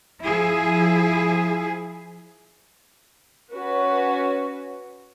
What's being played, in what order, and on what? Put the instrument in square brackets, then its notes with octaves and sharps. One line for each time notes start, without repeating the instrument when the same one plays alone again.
[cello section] F3 E4 G#4
[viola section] C#4 F#4 B4